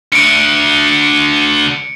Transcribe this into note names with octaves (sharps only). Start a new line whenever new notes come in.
D2 D3 C#7 D7